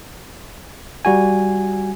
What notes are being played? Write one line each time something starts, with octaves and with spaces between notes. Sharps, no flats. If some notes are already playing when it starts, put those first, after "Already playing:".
G3 F#4 G#5